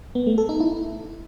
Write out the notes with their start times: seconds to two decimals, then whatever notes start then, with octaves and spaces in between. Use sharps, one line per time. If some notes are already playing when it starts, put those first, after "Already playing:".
0.15 B3
0.27 A3
0.38 A4
0.49 D#4
0.60 E4